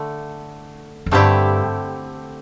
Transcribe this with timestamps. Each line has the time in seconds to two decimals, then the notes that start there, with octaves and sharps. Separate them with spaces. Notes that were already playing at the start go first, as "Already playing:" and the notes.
Already playing: D3 A3
1.06 F2
1.11 G2 D3 A3 C4 E4 G4